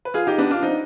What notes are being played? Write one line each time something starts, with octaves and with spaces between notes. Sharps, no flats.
B4
F4 G#4
D#4 G4
B3 D4
D4 F4
C4 D#4